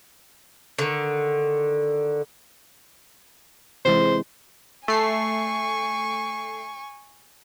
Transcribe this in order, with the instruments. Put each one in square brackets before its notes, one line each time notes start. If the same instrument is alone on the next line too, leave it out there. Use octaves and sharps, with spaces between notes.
[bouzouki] D3 D#3
[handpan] C3 E3 G#3 [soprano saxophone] C5
[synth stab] A3 C7 [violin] G#5 C#6